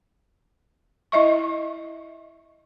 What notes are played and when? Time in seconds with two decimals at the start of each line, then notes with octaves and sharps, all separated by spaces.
1.12 E4 D#5 E5 C#6